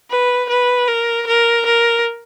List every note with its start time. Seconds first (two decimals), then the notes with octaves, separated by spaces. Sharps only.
0.10 B4
0.49 B4
0.88 A#4
1.27 A#4
1.66 A#4